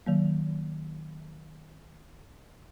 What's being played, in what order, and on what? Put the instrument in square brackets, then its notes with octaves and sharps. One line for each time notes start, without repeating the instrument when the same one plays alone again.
[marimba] D#3 F#3 A#3